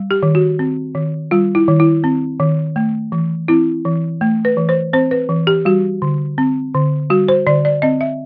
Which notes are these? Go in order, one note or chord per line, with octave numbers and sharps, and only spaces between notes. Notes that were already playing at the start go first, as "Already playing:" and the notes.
Already playing: G3
G4
D#3
F#4
C4
D#3
G3 F4
E4
D#3
E4
C4
D#3
A3
E3
C4 E4
E3
A3
B4
E3
C5
C4 C5
B4
E3
G4
G3 F#4
D3
C4
D3
G3 F#4
C5
D3 D5
D5
C4 D#5
E5